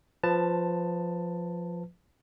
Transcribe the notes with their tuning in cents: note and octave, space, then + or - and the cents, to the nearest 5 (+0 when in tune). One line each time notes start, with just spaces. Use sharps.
F3 +5 B4 +20 A5 +10